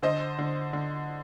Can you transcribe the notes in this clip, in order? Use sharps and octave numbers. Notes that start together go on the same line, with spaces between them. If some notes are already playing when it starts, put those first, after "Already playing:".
D3 C5 D#5
D3
D3